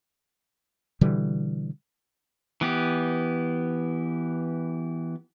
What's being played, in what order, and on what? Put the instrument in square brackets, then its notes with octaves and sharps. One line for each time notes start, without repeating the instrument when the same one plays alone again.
[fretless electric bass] B2 D3 E3 G3
[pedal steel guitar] E3 B3 G4